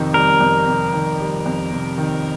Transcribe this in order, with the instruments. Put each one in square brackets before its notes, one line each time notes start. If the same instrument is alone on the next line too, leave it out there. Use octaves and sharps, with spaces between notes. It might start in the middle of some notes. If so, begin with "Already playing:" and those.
Already playing: [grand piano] F2 C3 D#3
[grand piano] G3 [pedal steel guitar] A#4
[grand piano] F2
C3
D#3
G3
F2
C3
D#3